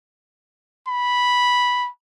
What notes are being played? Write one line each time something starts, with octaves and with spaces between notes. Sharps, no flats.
B5